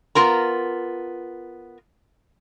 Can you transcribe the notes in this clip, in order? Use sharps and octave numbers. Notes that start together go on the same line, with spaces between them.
B3 F4 A#4 A#5